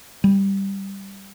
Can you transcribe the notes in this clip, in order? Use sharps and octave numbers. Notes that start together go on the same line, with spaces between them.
G3